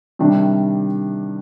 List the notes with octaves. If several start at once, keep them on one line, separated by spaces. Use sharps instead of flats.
C3 D#3 G3 D4